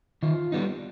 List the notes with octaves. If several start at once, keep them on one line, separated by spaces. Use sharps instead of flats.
D#3 F4
G3 B3 D#4